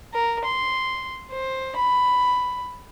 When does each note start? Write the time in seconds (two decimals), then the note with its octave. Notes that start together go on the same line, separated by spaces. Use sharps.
0.13 A#4
0.45 C6
1.31 C5
1.76 B5